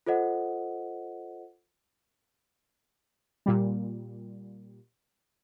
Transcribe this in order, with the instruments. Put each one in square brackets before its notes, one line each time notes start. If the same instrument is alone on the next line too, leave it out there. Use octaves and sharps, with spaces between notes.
[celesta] F4 A4 C5 D#5 F#5
[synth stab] A#2 G3